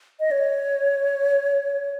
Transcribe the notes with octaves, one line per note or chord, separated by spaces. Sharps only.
D#5
C#5